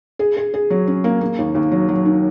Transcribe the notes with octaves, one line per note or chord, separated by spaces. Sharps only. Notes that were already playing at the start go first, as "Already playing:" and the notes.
G#4
G#4
G#4
F#3
C#4
A#3
A#3
D#2
D#2
F#3
F#3
D#3